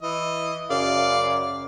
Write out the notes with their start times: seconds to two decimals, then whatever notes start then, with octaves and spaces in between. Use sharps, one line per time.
0.02 E3 D#5
0.70 F#2 C#3 D5 F5